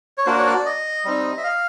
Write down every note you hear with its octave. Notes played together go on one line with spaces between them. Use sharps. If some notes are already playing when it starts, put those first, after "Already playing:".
C#5
A#3 D4 F#4 C5
C#5
D5
D#5
G3 C4 D#4
E5
F5